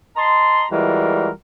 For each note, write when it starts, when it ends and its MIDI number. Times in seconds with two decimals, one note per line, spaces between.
0.17 0.66 75
0.17 0.66 81
0.17 0.66 82
0.17 0.66 84
0.71 1.30 52
0.71 1.30 55
0.71 1.30 56
0.71 1.30 65
0.71 1.30 66
0.71 1.30 70